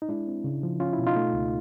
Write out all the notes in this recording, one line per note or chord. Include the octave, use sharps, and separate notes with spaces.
D#4
G#3 D4 E4
C4
C#3
F3
C#4 F4
E4
B2
D#4 F4
A3
C#2